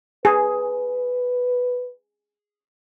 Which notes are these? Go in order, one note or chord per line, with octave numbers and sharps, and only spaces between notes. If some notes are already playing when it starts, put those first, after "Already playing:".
G#4 B4